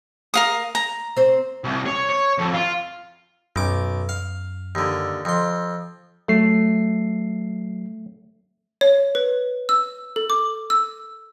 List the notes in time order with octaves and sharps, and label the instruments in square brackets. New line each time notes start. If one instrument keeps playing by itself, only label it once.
[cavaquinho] A#4 F5 D#6
A#5
[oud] C4 C5
[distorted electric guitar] C2
C#5
C#5
F2
F4
[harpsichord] B1 D6 [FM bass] F#2
[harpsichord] F5
D#2 D3
F2 C6
[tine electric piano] F#3 C7 [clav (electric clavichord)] A3
[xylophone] C#5
B4
E6
A4
D6
E6